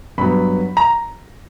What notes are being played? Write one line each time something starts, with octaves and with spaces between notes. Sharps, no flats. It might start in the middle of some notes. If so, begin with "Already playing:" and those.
G2 F#3 B3 B5
A#5